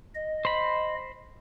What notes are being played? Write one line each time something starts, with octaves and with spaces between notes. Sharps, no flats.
D#5
C5 B5